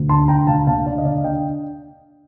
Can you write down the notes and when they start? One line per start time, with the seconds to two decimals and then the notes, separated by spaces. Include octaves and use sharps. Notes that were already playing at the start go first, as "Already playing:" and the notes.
Already playing: D2
0.09 D4 A5 C6
0.28 D4 G5 A#5
0.47 D2 F5 A5
0.67 D3 F5 A5
0.86 D4 D5 F5
0.98 D#5
1.05 D3 D5 F5
1.24 D4 D#5 G5